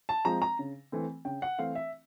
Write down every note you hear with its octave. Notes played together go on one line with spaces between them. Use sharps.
A5
F3 G#3 C4 A#5
A#5
C#3
E3 A3 C4
C#3 G5
F#5
E3 A3 C4 F5
E5